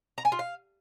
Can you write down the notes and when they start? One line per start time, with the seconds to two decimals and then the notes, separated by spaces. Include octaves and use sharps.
0.18 A#5
0.25 G#5
0.32 F4
0.39 F5